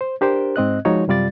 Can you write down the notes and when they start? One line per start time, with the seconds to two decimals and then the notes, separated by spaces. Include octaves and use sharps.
0.01 C5
0.21 D4 G4 A#4 C5
0.56 G#2 C4 D#5 F#6
0.85 F3 G#3 D#4 F#4 C#5
1.07 F#2 C3 G3 F4 D5 A6